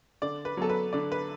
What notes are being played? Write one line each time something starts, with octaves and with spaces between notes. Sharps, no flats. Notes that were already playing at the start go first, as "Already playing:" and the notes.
D3 D5
B4
F#3 B3 A4
B4
D3 D5
B4